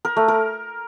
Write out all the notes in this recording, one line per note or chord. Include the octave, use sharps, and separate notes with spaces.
A#4
A3
A#4